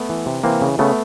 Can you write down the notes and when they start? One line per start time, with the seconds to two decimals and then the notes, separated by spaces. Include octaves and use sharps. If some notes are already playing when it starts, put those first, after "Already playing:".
Already playing: A3 B3
0.09 E3
0.26 C3
0.44 E3 A#3 C4
0.62 C#3
0.79 C#3 A3 B3